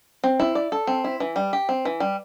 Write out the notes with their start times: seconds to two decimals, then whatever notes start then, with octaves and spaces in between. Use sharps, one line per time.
0.24 C4
0.40 E4
0.55 D5
0.72 A4
0.87 C4
1.04 E4
1.20 E3
1.36 G3
1.53 G4
1.69 C4
1.85 E3
2.00 G3